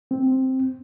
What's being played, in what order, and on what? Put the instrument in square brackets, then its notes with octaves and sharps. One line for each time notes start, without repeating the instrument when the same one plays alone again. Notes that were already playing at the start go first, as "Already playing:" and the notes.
[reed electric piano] C4